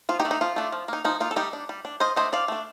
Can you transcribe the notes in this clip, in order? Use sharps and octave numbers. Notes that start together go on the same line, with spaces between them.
F3 F4
D#4 G4
A3 D4
D#4
F3 F4
A3 D4
F3
A#3 D#4
F3 D#4
A#3 D#4 F4
A4
G3 D#4 G4
D4
G3
D4
F3 C5 D#5
A3 D4 C5 D#5
F3 D5 F5
A3 D4